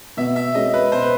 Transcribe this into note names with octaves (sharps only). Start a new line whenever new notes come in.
B2 E5
E5
G#3 C#4 F#4 A#4 D#5
B4
B2 C5
B4